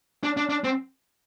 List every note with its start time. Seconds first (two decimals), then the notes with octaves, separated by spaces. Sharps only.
0.24 D4
0.37 D4
0.50 D4
0.64 C4